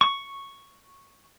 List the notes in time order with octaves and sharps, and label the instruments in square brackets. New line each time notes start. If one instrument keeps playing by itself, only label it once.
[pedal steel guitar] C#6